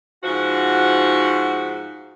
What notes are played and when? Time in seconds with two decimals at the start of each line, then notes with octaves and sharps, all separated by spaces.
0.24 G#2 F3 F#4